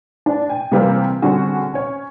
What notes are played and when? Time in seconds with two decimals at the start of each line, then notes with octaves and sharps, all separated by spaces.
0.26 D4
0.50 G5 G#5
0.72 C3 E3 G3 A#3 C4 G4
1.22 D3 G3 C4 C#4 F#4 G#4
1.74 C#4 C#5